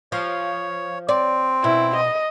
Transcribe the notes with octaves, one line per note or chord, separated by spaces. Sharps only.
F3 C#5
C4 D5
B2 E4
D#5